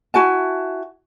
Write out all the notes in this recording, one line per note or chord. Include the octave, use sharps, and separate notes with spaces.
E4 F#4 G#5 A5